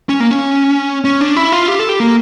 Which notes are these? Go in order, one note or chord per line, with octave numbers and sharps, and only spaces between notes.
C#4
A#3
C#4
C#4
D4
E4
F4
G4
A4
G4
A#3